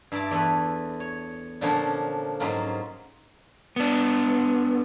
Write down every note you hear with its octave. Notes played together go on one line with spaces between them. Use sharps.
G2 E4 D5 A5
E2 A3 A4 B4
C#5
A#2 D3 F3 A#3 C#4 D4
G#2 F#3 A#3 C#4 F4 A#4
B3 D4